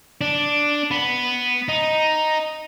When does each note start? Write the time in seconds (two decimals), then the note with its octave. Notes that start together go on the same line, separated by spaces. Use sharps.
0.21 D4
0.91 B3
1.69 D#4